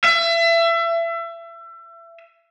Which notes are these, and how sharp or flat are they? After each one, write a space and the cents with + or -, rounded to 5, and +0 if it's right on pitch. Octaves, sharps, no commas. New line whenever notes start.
E5 +30